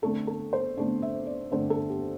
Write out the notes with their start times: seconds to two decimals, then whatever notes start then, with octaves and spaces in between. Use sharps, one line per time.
0.02 D3 A3 C4 A4
0.27 A4
0.53 C5
0.77 D3 A3 C4 D5
1.02 E5
1.26 D5
1.51 D3 A3 C4 C5
1.70 A4
1.90 G4